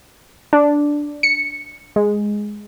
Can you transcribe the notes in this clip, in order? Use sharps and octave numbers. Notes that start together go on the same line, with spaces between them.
D4
C#7
G#3